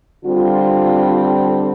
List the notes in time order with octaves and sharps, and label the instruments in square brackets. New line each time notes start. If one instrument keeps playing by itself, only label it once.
[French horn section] D3 G3 C4 F4